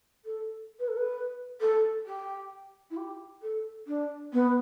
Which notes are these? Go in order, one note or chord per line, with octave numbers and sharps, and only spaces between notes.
A4
B4
A4
B4
A4
G4
E4
G4
A4
D4
B3